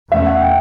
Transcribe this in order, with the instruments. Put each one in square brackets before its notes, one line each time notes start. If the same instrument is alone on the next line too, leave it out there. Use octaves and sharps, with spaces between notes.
[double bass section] E2 B2 A3 C#4 [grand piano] E5
[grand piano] F#5
G5